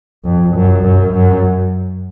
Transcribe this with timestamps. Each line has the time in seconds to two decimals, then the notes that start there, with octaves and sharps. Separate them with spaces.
0.25 F2
0.55 F#2
0.83 F#2
1.14 F#2